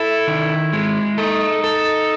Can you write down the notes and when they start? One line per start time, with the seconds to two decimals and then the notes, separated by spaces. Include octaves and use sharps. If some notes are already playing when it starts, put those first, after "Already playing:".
Already playing: E4 A4
0.27 D#3
0.73 G#3
1.17 D#4 A4
1.64 A4